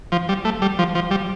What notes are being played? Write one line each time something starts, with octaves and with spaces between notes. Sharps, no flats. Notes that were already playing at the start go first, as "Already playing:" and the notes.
F3
G3
A3
G3
F3
F3
G3